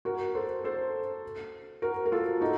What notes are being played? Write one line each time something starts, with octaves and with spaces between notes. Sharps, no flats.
F#4 A#4
A4 C5
A4 C5
F#4 A#4
A#4
F4 A4
D#4 F#4